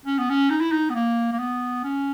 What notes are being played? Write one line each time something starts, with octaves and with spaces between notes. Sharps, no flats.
C#4
B3
C#4
D#4
E4
D#4
B3
A#3
A#3
B3
C#4